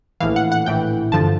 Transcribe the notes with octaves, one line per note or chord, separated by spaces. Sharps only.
A#1 A2 E3 F5
F#5
F#5
A#1 A2 E3 G5
G2 D3 F3 A5